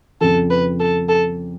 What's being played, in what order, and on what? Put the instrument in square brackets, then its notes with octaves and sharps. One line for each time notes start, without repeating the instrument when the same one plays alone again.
[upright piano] F2 C#3 F3 [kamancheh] A4
[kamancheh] B4
A4
A4